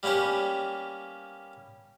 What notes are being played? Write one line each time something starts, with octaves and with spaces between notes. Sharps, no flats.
G3 A#3 B3 C#4 G4